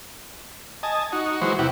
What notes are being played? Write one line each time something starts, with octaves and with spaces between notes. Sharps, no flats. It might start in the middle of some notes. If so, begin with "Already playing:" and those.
D#5 G#5 A5
D#4 F#4
E3 F#3 G#3 F#4 C5
E2 C3 E4 F#5 G5